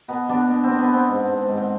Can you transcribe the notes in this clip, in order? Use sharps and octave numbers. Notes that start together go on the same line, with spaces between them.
B2 B3
B2 B3 D4
B2
C4
B2
B3
B2 C4
G#2
G#2
G#2
C4